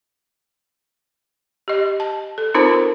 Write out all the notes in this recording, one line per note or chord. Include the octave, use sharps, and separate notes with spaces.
G4 D#5
A5
A4
C4 D#4 F4 A#4 C5 A5